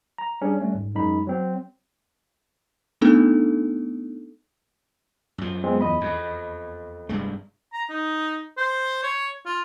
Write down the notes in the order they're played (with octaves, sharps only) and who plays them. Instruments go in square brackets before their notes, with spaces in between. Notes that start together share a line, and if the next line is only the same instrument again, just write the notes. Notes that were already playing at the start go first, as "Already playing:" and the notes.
[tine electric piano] A#5
G3 C#4 D4 G#4
G3 A3 C#4
G1 G#2
F#2 G#3 D#4 B5
F#3 C4
[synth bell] A3 B3 C4 D4 D#4 A4
[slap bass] F#2 F3
[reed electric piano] G#3 B3 C4
E2 D#5 B5
[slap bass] F2
F1 G2 G#3
[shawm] A#5
D#4
C5
C#5
F4